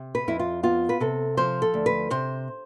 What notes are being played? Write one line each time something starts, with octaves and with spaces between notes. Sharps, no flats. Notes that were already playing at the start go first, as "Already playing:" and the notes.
Already playing: C3
B4
F2 E4
F4
B3 F4
B4
C3 A4
F3 C5
A4
D2
B4
C3 C5